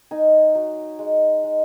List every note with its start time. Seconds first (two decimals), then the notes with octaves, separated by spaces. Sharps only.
0.11 D#4 G#5
0.55 F#3
0.99 G#3
1.44 G#3